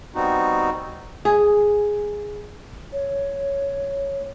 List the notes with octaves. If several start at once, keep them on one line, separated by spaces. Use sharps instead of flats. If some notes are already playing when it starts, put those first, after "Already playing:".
G3 B3 C4 D#4 F#4
G#4
C#5